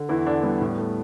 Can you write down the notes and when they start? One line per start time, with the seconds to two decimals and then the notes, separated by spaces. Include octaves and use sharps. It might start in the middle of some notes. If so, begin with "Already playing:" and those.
Already playing: D3
0.09 E2 E3 E4
0.26 E2 D3 D4
0.43 G3 B3
0.61 A2
0.78 A3